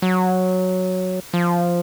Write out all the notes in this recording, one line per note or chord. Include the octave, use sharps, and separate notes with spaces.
F#3
F3